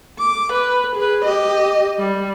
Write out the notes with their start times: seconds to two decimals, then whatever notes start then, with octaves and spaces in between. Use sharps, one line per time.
0.19 D6
0.52 B4
0.95 G#4 B4
1.24 G4 D#5
1.99 G3